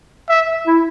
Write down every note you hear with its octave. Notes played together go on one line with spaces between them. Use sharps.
E5
E4